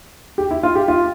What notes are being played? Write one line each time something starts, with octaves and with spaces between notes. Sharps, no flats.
G4
E4
F4
G4
F4